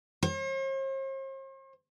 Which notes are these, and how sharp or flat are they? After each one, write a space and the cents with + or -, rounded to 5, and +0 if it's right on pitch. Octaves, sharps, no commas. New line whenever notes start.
C5 +45